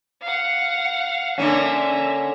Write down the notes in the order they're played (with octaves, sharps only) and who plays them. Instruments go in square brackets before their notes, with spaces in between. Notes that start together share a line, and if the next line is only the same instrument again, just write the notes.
[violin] F5 F#5
[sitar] D3 A#3 C#4 [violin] E5